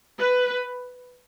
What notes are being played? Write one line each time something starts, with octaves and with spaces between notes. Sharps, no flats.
B4